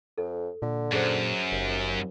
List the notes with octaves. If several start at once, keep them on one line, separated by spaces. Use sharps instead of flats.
F2 A4
A#2 D3
F#2 G#4 C5
F#1 D#2